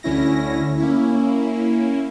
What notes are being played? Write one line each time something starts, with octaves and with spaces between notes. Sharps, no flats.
D2 D3 C#4 E4 A#6
A#3 C#4 E4